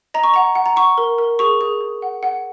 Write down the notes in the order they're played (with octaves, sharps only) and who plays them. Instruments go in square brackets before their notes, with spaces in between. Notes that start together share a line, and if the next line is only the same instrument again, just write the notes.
[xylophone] D#5 A#5
C#6
F#5 A#5
F#5
A#5
F#5 C#6
A#4
A#4
G#4 C#6
G#4
G#4
F#5
F#5